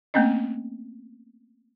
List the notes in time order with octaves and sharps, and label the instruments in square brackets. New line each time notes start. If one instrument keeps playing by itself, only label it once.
[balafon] A3 A#3 C4 C#4 D#5